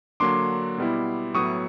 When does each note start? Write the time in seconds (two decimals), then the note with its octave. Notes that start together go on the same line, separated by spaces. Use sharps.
0.20 D3 F#3 A#3 D4 C6 D6
0.78 B2 G3 B3 E4
1.34 A2 F#3 B3 E4 C#6 D#6